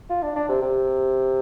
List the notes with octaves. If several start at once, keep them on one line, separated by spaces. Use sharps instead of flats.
F4
D4
D4
C3
C3